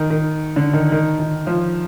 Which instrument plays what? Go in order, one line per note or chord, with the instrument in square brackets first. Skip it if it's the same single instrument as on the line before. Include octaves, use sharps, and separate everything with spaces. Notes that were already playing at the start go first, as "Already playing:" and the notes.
Already playing: [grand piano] D#3
D#3
D3
D#3
D#3
D#3
F3